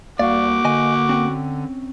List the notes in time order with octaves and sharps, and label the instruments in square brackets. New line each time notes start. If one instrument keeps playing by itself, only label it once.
[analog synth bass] C2 [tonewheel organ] A#3 [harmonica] F#4 D6 [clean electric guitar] D5 F5
[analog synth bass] D3 [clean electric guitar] D#5 G#5
[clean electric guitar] C4 C#4 G5